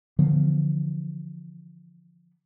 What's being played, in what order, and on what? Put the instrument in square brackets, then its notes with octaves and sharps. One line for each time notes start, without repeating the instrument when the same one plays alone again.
[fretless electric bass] D3 E3 F3 B3